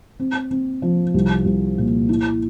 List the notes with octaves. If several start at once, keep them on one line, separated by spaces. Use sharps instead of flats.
C4
C4
F3
C2
C2
A#2
E4